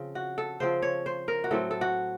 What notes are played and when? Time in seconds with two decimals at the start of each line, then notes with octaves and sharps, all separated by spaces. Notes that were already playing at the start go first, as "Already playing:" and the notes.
Already playing: C#3 F3 C4
0.15 F#4
0.38 A4
0.60 C#3 F3 C4 C5
0.82 C#5
1.06 C5
1.28 A#4
1.44 F#4
1.51 A2 F#3 C4 A4
1.71 A4
1.81 F#4